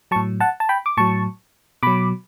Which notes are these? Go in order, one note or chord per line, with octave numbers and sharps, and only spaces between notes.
A2 F#3 A5 C#6
F#5 A5
A5
G5 B5
D6
A2 F#3 A5 C#6
B2 F#3 B5 D6